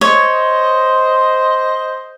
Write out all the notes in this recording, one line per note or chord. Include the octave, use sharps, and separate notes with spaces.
C5 C#5 D#5